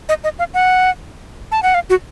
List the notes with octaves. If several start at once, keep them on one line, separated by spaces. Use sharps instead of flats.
D#5
D#5
F5
F#5
A5
F#5
F5
F#4